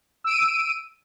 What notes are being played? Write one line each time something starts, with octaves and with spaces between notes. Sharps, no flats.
E6 D7 D#7